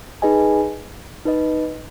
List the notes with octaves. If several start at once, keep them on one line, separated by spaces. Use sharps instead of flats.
D#4 G#4 B4 D#5 G#5
D#4 B4 D#5